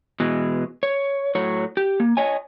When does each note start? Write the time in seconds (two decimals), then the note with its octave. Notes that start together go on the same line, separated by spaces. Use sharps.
0.20 B2 E3 G#3
0.83 C#5
1.35 A2 F#3 C#5
1.77 G4
2.00 A#3
2.17 C#5 D#5 G#5